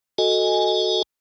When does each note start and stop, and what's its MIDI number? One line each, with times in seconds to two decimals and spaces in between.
0.18 1.02 66
0.18 1.02 69
0.18 1.02 75
0.18 1.02 80